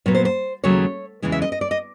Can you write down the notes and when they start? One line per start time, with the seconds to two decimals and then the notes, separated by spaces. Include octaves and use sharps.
0.06 A#2 F#3 B3 C#5
0.15 C5
0.25 C5
0.64 D#2 C#3 F#3 A3 C#5
1.22 E2 C#3 E3 G#3
1.32 E5
1.42 D#5
1.52 D#5
1.61 D5
1.71 D#5